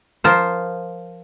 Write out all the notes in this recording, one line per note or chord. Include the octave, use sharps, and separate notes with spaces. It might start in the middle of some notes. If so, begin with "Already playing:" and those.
F3 F4 A#4 C5